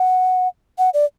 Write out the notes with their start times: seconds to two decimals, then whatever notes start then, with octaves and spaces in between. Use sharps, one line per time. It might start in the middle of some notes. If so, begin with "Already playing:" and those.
Already playing: F#5
0.78 F#5
0.94 D5